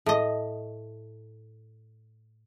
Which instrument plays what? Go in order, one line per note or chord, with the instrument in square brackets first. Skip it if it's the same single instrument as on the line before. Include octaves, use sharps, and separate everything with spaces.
[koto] A2 D#5